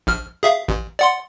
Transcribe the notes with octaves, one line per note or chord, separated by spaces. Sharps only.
A#1 F6
G#4 E5 F5
A1
D5 F#5 C6